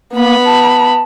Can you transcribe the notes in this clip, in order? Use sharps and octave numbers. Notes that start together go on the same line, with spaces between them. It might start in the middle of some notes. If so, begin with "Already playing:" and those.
A#3 B3 B5
A5